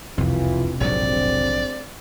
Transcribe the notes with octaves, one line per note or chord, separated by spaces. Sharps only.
E1 C2 F2 C3 E3 F4
A#1 G#2 D3 F#3 G#3 C4 D5